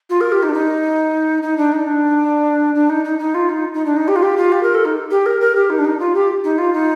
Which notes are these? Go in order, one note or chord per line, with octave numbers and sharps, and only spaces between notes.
F4
A#4
G4
D#4
D4
D#4
D#4
D4
D#4
D4
D4
D#4
D#4
D#4
F4
D#4
D#4
D4
D#4
G4
F4
G4
F4
G4
A#4
A4
D#4
G4
A#4
A#4
G4
D#4
D4
D#4
F4
G4
D#4
F4
D#4